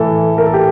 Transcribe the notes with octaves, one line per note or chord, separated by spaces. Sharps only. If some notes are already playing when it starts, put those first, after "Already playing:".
Already playing: A2 E3 A4
A#4
A4
G4